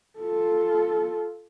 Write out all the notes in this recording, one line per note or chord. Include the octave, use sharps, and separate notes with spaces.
F4 A4